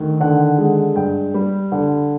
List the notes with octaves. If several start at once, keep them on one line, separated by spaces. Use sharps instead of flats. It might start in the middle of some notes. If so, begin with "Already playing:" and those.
Already playing: D2 D#3
D3 F#5
G#3
G2 G5
G3
D3